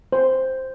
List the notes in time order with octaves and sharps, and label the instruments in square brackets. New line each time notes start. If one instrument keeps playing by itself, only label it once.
[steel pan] C5